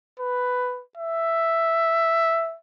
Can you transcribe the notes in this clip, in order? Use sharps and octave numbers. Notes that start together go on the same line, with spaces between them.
B4
E5